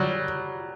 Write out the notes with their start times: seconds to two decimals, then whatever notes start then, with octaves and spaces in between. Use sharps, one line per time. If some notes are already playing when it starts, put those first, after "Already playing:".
Already playing: F#3 G3